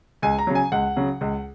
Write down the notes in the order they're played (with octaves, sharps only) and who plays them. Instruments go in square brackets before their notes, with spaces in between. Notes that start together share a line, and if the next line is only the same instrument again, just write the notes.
[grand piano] C#2 G#5
A#5
C#3 F#3
G#5
C#2 F#5
C#3 F#3
C#2